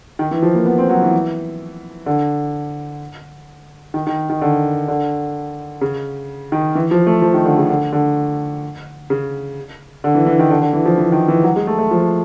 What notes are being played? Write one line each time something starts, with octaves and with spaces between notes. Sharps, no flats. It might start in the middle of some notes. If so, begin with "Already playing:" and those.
D#3
E3
F3
A#3
B3
C4
F#3
E3
D3
D#3
D#3
D#3
D3
D3
C#3
D#3
E3
F3
A3
F3
D#3
D3
C#3
D3
D3
C#3
D3
E3
E3
D#3
D3
D3
E3
F3
E3
D#3
E3
F#3
G#3
A3
A3
F3